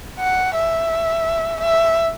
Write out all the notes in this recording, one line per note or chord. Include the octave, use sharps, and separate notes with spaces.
F#5
E5
E5